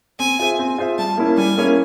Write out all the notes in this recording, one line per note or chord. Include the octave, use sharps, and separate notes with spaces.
C4 G#5
F4 G#4 C5 E5
C4
F4 G#4 C5 E5
G3 A5
A#3 C#4 E4
G3 G#5
A#3 C#4 E4